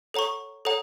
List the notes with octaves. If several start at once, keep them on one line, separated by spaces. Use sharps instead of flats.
A4 C#5 F#5 A#5 C#6
A4 C#5 F#5 A#5